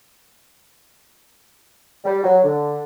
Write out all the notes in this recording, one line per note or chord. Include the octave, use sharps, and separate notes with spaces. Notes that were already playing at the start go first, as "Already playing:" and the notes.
G3
F#3
D3